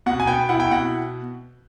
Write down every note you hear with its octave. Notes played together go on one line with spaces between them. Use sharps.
B2 F#5
G#5
B3 G5
E4 F#5
G5
B2 F#5